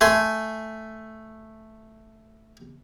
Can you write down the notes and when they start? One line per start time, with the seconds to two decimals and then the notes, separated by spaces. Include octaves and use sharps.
0.01 A3 G#5 C6